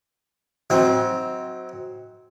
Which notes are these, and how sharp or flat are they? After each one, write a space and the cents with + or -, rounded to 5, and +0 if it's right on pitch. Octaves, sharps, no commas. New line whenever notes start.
F#3 +0 C4 +0 D#4 +35